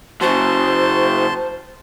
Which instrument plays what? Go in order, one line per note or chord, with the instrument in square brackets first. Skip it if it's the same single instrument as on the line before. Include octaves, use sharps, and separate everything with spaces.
[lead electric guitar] C#3 F#3 [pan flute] C5 [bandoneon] A5 C6